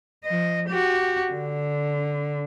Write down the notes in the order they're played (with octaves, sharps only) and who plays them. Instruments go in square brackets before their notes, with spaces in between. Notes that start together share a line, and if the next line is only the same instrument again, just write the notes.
[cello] F3 D#5
F#4 G4
D3